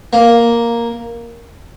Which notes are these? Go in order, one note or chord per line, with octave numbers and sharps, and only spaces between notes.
A#3